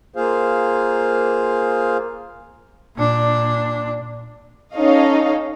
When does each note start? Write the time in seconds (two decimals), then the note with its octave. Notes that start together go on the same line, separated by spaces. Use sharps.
0.16 A#3 F4 G#4 C5 F5
2.96 A#2 D4
4.75 C#4 D#4 A4 C#5 D#5 F5